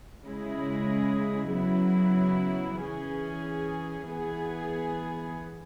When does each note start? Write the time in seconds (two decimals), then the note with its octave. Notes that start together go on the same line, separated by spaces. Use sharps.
0.25 C#3 G#3 E4 G#4
1.53 C#3 F#3 B3 E4
2.81 E3 C#4 G#4
4.08 E3 B3 G#4